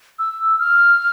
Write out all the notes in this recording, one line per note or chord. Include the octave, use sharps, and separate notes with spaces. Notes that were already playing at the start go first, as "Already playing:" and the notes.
E6
F6